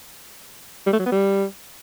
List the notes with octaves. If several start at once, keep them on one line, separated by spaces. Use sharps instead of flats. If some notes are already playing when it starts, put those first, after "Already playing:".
G3
A3
F#3
B3
G3